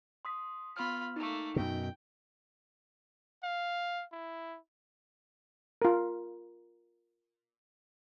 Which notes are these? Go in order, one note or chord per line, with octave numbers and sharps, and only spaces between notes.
C6 D#6 B6
B3 F4 B5 F6
A3 A#3 D#4
F#2 B2 G5
F5
E4
F4 A#4